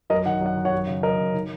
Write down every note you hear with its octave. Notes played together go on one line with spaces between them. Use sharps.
F#2 A#4 D#5
D#3 F#5
F#2 F#5
D#3
C#5 F#5
F#2
C#3
F#2 A#4 D#5
C#3
D#3